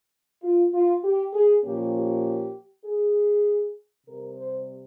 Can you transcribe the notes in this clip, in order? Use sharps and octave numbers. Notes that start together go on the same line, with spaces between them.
F4
F4
G4
G#4
A#2 F3 A#3 C#4 G4
G4
G#4
C3 G3 C4 A#4
C5